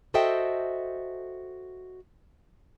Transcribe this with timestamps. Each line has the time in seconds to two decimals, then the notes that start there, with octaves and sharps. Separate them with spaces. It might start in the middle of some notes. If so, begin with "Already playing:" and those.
0.14 F#4 A4 C5 D#5 E5 G5